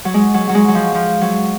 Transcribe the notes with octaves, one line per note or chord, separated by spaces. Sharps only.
F#3
G#3
F#3
F#3
G#3
F#3
F3
F3
F#3